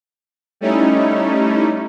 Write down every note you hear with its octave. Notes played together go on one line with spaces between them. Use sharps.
G3 A3 C#4 D#4 E4